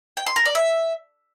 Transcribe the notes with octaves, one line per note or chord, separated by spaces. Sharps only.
G5
C6
A#4
D5
E5